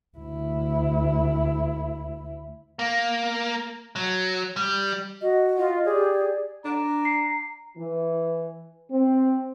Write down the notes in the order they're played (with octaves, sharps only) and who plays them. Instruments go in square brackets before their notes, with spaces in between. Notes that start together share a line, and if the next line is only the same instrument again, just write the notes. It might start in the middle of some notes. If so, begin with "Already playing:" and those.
[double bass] D2 E4
[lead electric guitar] A#3
F#3
G3
[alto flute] F#4 [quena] D#5
[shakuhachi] F4 [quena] D#5
[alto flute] G4 [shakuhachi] G#4 [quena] D5
[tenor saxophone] D4 [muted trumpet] A#5
[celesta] C7
[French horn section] E3
C4